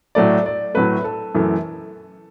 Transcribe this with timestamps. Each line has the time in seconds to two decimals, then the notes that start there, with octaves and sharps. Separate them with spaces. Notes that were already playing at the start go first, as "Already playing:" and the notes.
0.15 A2 F#3 A3 D5
0.46 D5
0.74 A2 F#3 A3 B4
1.04 A4
1.35 F#2 E3 A3